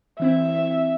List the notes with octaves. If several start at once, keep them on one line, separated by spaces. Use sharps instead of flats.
E3 C4 E4 E5